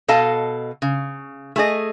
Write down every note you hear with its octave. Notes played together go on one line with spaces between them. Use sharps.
B2 A4 D#5 F5 A5
C#3
A3 G#4 D#5